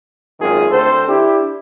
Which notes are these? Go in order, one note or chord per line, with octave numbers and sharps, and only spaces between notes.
G#1 F#2 D#3 F4 G#4
D2 C4 A4 C5
D4 E4 G4